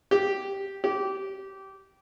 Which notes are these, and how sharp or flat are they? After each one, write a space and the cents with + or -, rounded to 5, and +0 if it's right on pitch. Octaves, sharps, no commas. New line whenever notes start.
G4 -5
G4 -20